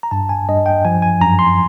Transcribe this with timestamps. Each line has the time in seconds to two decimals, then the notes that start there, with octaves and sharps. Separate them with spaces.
0.03 A#5
0.11 G2 A5
0.29 G#5
0.48 G2 D#5
0.66 G5
0.85 F3 G#5
1.02 G#5
1.21 F#2 A#5
1.39 C6